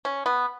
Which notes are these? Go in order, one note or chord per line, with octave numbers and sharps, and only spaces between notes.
C#4
B3